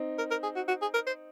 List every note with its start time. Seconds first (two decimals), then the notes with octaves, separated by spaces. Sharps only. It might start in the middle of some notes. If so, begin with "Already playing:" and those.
Already playing: C4 D#4
0.18 A#4
0.31 A#4
0.43 G#4
0.56 F#4
0.68 F#4
0.81 G#4
0.94 A#4
1.07 C5